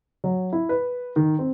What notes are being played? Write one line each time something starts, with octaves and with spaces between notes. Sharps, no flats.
F#3
E4
B4
D#3
C4